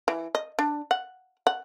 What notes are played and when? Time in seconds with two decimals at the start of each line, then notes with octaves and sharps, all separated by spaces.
0.08 E3
0.35 D#5
0.59 D4
0.91 F#5
1.47 F#5